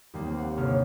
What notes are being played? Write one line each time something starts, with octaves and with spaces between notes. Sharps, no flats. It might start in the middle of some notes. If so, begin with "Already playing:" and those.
D#2 G3 A#3
C4
F#5
G1 C3 A#3 C#5 F6